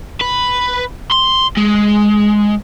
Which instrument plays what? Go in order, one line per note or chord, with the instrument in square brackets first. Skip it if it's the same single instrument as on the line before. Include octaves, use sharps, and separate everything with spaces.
[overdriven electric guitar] B4
C6
G#3